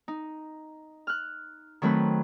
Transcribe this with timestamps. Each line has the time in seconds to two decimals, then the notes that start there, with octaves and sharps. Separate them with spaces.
0.08 D#4
1.07 F6 F#6
1.82 D#3 F#3 A3 C4 B4